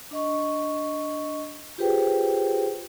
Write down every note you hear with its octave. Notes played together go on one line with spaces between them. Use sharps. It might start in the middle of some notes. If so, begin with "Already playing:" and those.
D4 D#5 C#6
F4 G4 G#4 B4 C5 G5